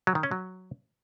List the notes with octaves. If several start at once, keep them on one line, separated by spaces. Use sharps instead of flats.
F#3
D#3
C#4
F#3